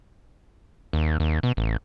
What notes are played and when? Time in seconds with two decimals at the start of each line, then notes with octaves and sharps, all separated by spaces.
0.93 D#2
1.20 D#2
1.43 B2
1.57 A1